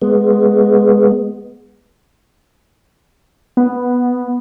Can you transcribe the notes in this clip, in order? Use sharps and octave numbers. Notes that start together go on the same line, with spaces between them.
G#3 B3
B3